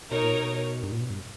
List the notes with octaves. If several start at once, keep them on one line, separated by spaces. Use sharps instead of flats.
B2 D#4 A#4 C#5
A#2
B2
G2
A#2
B2
G2